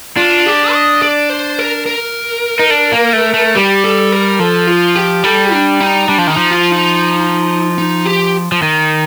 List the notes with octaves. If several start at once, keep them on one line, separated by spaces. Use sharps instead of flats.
D4 F4
G4
D#5
D5
C5
A#4
A#4
D#4
D4
A#3
A3
A3
G3 G4
A4
A#4
F3 A4
F4
G4
G3 A4
D4
D#4
G3 D4
F3
D#3 D#4
F3
F4
D#4
D#4
G4
F3
D#3